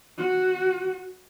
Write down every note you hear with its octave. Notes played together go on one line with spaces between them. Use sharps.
F#4